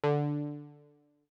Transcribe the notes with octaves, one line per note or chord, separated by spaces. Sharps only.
D3